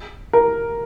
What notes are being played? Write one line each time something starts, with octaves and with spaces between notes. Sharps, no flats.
A#4